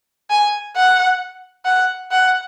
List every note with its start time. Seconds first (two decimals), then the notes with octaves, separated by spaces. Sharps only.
0.30 G#5
0.76 F#5
1.65 F#5
2.11 F#5